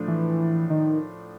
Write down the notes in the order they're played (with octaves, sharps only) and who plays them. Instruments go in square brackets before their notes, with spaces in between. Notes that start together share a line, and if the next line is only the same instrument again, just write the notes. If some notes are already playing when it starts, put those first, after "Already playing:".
Already playing: [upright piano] A2 F3 A3 D4
[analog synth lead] E3
D#3